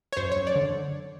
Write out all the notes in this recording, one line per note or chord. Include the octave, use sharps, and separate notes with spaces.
C#5
F#2 C5
F#2 C#5
D5
D3